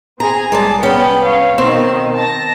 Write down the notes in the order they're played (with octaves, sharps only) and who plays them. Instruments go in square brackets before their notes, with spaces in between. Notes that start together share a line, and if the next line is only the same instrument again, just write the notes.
[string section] C4 G#4 [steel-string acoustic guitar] A#5
[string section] C2 G#4 [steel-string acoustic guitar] G#3 D5 A5
[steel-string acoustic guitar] B3 C#4 [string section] G5
[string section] C#5 F5
[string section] B2 D#3 [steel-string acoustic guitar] C4
[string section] A5 A#6